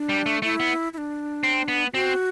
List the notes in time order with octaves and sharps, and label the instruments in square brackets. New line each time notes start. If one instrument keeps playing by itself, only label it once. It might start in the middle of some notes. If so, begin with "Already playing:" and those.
Already playing: [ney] D4
[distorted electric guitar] G3
A3
[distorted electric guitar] A3 [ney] E4
[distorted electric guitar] B3
[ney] E4
D4
[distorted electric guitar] C4
B3
[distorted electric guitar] C4 [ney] F#4